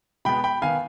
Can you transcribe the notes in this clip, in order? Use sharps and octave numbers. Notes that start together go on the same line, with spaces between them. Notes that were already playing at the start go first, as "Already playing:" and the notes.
B2 G#3 B3 G5 B5
G5 B5
D#3 B3 F5 G#5